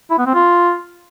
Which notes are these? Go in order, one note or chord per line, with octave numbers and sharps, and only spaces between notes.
E4
B3
C4
F4